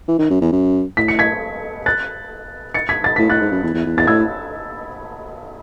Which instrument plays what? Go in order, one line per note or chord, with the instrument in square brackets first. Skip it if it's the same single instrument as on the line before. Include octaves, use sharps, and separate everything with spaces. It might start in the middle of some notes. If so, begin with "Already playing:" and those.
[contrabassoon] E3
D#3
F#2
E2
F#2
[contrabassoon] A2 [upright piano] B6
[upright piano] C#7
G#6 B6
F#6 A6
A6 C#7
G#6 B6
A6
[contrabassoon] A2 [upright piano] B6
[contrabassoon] A2 [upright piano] F#6 A6
[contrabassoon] G#2
F#2
E2
E2
E2
[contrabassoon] E2 [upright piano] A6
[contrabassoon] A2 [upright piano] E6 G#6